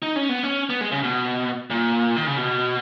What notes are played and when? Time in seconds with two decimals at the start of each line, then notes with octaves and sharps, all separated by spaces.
0.02 D#4
0.16 C#4
0.29 B3
0.43 C#4
0.70 B3
0.81 G#3
0.92 C#3
1.03 B2
1.70 A#2
2.16 D#3
2.27 C#3
2.37 B2